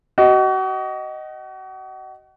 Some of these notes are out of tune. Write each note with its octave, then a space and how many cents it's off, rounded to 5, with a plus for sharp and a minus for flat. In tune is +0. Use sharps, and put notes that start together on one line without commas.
F#4 +35 D#5 +0